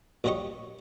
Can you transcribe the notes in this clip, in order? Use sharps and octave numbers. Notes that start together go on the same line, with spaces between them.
A#1 F#2 F#3 G3 D#5 C#6